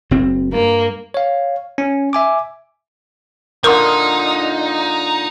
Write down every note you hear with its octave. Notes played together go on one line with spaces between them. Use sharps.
F#1 C4
G2 A#3
C#5 F5
C#4
E5 G#5 D6
A#2 D3 D#4 A#4 C6 D#6 F6